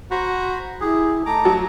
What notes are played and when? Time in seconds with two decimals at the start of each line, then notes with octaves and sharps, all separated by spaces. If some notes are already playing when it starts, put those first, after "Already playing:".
0.11 F#4 C5 A#5 B5
0.81 E4 G4 G#4
1.26 A3 D#4 A5 A#5 D6
1.45 F#3